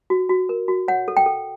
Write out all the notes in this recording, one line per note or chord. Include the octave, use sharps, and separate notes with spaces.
F#4
F#4
A#4
F#4
C#5 F#5
A4
G5
A4